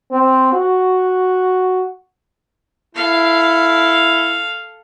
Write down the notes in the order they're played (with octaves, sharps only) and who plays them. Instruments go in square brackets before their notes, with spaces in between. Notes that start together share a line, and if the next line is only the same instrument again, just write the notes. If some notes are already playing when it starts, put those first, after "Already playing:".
[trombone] C4
F#4
[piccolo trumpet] E4 [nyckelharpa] A4 F5